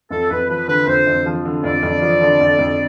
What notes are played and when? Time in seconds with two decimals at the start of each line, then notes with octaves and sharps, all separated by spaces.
0.11 F2 A4
0.30 F2 B4
0.49 F3 B4
0.68 D3 B4
0.87 F2 C5
1.07 F2
1.26 F3
1.45 D3
1.64 F2 D5
1.83 F2
2.02 F3
2.21 D3
2.41 F2
2.59 F2